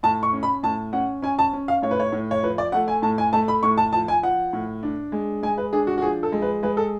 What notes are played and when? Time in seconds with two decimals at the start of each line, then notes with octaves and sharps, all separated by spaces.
0.03 A2 A5
0.23 C#6
0.33 C#4
0.43 B5
0.63 A2 A5
0.93 C#4 F#5
1.22 C#4 G#5
1.39 A5
1.53 C#4
1.68 F5
1.82 A2 C#5
1.91 B4
2.00 C#5
2.12 A2
2.31 C#5
2.43 F3 B4
2.58 D5
2.72 A3 F#5
2.88 G#5
3.02 A2 A5
3.18 G#5
3.33 A3 A5
3.48 B5
3.63 A2 C#6
3.78 A5
3.93 F3 A5
4.08 G#5
4.23 F3 F#5
4.53 A2
4.83 D4
5.12 G#3
5.43 G#3 G#5
5.58 B4
5.73 D4 G#4
5.87 F#4
5.98 F#4
6.02 F3 G#4
6.23 A4
6.32 G#3
6.42 B4
6.63 G#3 B4
6.77 A4